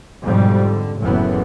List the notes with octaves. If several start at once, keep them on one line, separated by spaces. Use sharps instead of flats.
F2 G#2 B2 G3
D3
F#1 F#2 A2 E3 B3